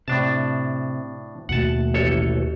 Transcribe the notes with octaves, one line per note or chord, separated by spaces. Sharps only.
A2 C3 D4 A5
D#2 B2 A3 F#5 A5
A1 A4 C#5